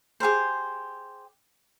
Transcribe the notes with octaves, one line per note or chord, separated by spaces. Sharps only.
G4 G#4 A#4 C5